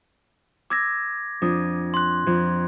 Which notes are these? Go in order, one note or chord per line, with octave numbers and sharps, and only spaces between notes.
D6 E6 G#6 A#6
F2 D4 D#6
C6 F#6
F2